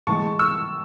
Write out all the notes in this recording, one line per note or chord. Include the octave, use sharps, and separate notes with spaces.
A2 E3 G#3 A5 C#6
C#6 E6